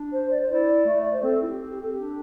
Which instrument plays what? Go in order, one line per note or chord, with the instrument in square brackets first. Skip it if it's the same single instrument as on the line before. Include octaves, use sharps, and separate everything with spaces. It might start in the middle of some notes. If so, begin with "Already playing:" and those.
Already playing: [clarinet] D4
[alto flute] C5
D5
C5
[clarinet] E4 [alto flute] D5
[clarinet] A3
[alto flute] D5
C5
[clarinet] C4 [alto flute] A4
[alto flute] E4
G4
G4
A4
[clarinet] D4 [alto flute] G4